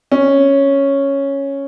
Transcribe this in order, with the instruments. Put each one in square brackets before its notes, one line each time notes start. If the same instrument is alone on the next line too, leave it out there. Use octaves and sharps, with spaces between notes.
[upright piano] C#4